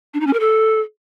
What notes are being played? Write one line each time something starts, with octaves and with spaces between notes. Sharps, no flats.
D4
D#4
C#4
A#4
A4